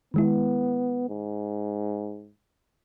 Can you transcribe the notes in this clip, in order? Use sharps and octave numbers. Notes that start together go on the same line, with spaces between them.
D#3 G#3 B3 E4
G#2